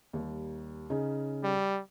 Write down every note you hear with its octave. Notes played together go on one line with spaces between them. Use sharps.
D#2 G3
C#3 C#4 D#4
G3